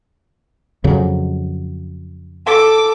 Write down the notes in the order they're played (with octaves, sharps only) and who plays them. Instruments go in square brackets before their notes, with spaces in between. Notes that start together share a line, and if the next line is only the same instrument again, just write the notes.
[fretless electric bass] F2 C#3 F#3
[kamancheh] A4 D6